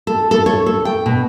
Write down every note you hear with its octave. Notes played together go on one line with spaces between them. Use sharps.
A4
A4
C#5
A4
G5
B2